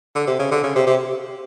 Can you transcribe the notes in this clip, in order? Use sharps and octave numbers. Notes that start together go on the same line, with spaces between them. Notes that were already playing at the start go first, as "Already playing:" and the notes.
D3
C3
C#3
D3
C#3
C3
C3